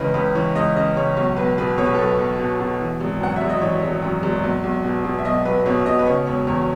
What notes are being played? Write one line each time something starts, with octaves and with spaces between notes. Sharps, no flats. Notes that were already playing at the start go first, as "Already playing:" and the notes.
Already playing: C#2 C#3 E3 B4 D#5
C#2 B4
E3 C#5
C#2 D#5
C#3 D#5
C#2 C#5
B1 C#5
B1 B4
B2 B4
B2 C#5
B4
A4
B1 B4
B1
B2
B2
E3
G#1
F#2 F#5
E5
G#1
D#5
E3 C#5
G#1
F#2
G#1
B1
B1
B2
B2
E5
B1 D#5
B1 B4
B2 C#5
B2 D#5
B4
C#3 C#5
E1 C#5
E2 C#5